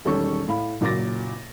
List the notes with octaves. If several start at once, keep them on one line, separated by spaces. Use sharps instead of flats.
E1 D#3 G3 C#4 A4 C#6
A2 F5 B5
F#1 A#2 F#3 D6 A6 A#6